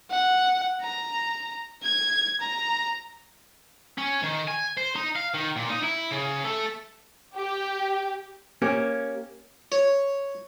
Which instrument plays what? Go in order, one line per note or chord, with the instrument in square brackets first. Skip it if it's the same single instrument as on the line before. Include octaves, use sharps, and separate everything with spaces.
[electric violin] F#5
A#5
G#6
A#5
[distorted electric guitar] C#4
D#3
G#5
C5
D#4
F5
D#3
A#2
D#4
E4
C#3
A3
[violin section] G4
[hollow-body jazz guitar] A#3 C#4 G4
[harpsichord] C#5